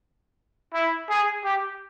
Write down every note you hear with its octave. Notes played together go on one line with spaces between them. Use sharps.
E4
G#4
G4